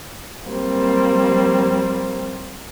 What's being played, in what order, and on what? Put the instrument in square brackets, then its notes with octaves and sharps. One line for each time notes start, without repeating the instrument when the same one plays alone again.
[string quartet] F#3 G3 A#3 C4